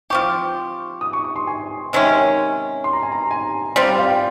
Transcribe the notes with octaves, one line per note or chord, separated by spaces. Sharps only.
F3 C4 G4 C#6
D#6
C#6
C#6
C6
G#5
C3 D#3 G#3 C#4
C6
A#5
G#5
A#5
G#5
G3 C4 F4
G5
F5
G5